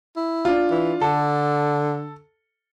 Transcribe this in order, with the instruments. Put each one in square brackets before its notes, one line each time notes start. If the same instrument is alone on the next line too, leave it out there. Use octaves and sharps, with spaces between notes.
[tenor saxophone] E4
[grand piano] D4 F4
[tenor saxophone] E3
[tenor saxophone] D3 [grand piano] A4